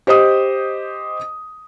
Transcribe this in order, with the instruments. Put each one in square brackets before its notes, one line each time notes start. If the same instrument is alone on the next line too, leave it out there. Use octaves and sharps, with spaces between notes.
[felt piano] G4 C5 D#5 D#6